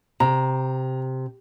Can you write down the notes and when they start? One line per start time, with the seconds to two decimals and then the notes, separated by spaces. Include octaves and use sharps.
0.20 C3 A#5